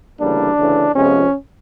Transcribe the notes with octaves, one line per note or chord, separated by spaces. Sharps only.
D2 C#3 E3 G3 A#3 D4
D2 C#3 E3
F2 C3 F3 G#3 B3 C#4